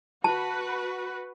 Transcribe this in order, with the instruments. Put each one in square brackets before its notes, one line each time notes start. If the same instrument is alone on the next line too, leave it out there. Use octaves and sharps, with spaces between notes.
[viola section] F#4 B4 [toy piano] A5